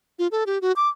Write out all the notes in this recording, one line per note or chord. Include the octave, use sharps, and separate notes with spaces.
F4
A4
G4
F#4
D6